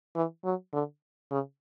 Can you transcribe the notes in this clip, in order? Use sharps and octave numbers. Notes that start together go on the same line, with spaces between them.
E3
F#3
D3
C#3